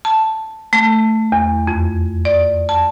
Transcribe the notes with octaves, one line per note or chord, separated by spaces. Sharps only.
A5
A3
E2
F2
D5
A5